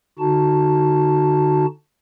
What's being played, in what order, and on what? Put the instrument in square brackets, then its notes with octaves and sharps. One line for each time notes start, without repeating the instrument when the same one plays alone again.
[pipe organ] D3 D#4 F#4 A5